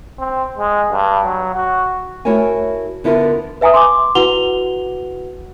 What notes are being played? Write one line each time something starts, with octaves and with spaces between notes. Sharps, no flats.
C4
G#3
G2
F#3
F#4
A3 E4 F#4 A#4 C#5 G#5
D3 B3 E4 F4 A#4
B4 E5 G#5 A#5 D#6
C6 D6
E4 F#4 B4 F#5 F7 G7